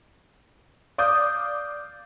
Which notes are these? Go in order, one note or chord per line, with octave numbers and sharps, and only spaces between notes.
D5 F5 D6 D#6 G6